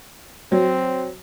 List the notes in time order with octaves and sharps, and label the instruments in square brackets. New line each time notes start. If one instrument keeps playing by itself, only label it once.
[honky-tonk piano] F#3 [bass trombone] C4